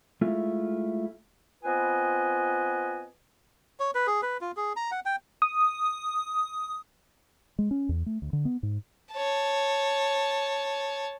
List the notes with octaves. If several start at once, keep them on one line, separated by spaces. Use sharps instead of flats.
G#3 A3 E4 F4
B3 C4 F4 B4 D#5 G#5
C#5
B4
G#4
B4
F4
G#4
A#5
F#5
G5
D#6
G#3
C#4
E2
A3
D2
D3
B3
G#2
C#5 A5